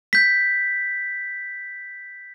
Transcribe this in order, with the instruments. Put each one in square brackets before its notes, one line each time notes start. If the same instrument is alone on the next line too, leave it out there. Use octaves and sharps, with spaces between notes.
[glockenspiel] G6 B6